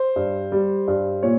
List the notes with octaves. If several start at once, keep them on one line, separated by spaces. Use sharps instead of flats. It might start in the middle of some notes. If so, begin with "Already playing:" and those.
Already playing: C5
G2
G3
G2
A#2 C#5